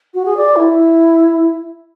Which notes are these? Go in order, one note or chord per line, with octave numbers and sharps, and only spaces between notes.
F#4
G#4
D5
E4